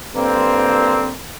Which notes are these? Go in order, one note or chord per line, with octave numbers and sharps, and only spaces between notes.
G2 D3 A#3 C4